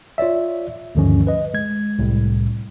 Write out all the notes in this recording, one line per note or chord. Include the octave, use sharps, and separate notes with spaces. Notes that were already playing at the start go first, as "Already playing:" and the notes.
F4 C#5 D5 E5
D2 G2 D3 D#3 F3 C#4
B4 D#5
G#3 G#6
C2 A2